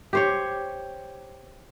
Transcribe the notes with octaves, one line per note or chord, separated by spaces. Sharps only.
G4 C5 C#5